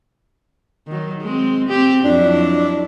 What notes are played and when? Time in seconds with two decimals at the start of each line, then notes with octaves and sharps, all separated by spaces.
0.87 D#3 F#3
1.22 G#3 C4
1.69 C4 G4
2.04 F2 F#3 D4 E4